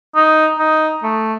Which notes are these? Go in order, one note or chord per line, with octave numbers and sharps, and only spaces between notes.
D#4
D#4
A3